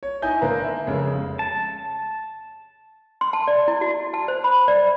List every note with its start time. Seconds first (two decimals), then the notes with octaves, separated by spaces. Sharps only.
0.03 C#5
0.22 D#4 E4 G#5 G6
0.41 D3 A#3 B4 A#5
0.64 E5
0.87 F1 C#3 G#3 C#5
1.39 A5
3.21 C6
3.33 A5
3.48 D5
3.68 E4
3.81 F#4
4.14 A5
4.28 C5
4.44 B5
4.68 D5